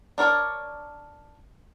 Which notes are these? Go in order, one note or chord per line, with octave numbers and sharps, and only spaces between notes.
D4 A#4 C#5 D5